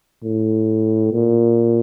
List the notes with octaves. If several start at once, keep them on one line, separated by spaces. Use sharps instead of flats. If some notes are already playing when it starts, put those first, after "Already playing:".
A2
A#2